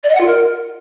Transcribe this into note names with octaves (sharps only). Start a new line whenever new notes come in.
D5
D#5
F#5
F4
A#4